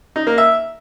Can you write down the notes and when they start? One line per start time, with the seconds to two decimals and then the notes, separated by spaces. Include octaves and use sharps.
0.16 D#4
0.27 A#3
0.38 E5